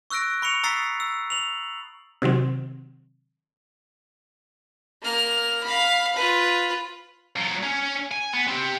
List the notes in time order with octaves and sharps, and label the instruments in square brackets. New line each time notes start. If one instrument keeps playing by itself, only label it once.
[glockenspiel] C#6 E6 F#6 A#6 D7
B5 C#6 C#7 F7
A#5 D#6 E6 A6 B6 C7
E6
F7 F#7
[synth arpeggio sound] C3 D#3 F#3 C4
[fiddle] A#3 F6
F5 B5
F4 B4
[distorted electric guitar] F#3 F4
C#4
G#5
B3
C4 G4